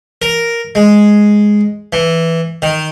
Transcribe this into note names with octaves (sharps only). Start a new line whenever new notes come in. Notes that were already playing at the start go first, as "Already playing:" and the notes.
A#4
G#3
E3
D#3